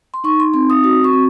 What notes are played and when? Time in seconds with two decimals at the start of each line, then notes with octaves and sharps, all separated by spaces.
0.14 C6
0.24 D#4 C#6
0.40 C6
0.54 C4 C6
0.70 D#6
0.84 F#4 D#6
1.04 C#6
1.13 C4